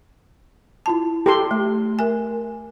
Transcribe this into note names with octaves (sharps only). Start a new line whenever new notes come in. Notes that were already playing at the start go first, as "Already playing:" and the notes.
E4 F4 A5
G4 A4 C6
A3
A#4 E5 G#5